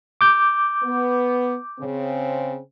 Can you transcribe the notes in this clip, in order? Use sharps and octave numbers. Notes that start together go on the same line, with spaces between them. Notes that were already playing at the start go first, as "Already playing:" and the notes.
D6 G6
B3
C#3 C4